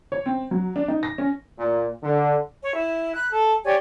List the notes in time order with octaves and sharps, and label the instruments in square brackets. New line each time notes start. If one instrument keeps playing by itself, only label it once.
[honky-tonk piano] C#5
C4
F#3
D4
D#4
A#6
C#4
[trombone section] A#2
D3
[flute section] C#5
E4
B5 F#6
A4
G4 C#5 D5 G#5